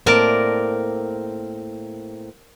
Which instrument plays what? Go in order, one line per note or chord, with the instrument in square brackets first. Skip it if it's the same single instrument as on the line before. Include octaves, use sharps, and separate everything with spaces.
[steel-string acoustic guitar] A2 A#3 C4 [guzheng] A#4 D5 A5